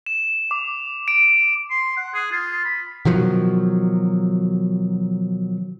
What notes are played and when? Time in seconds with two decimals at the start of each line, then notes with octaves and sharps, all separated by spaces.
0.06 E7
0.51 D6
1.08 D7
1.70 C6
1.97 F#5
2.14 G#4
2.32 F4
2.65 B5
3.05 B2 D#3 F3 F#3